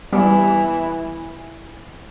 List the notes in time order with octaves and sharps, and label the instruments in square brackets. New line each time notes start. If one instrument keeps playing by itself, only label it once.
[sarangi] E3 [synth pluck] G3 B3 G4